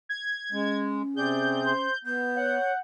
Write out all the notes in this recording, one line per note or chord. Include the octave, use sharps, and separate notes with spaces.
G#6
G#3 C#4
C3 C4 G#4 D5 G6
C5
B3 G6
C#5 F#5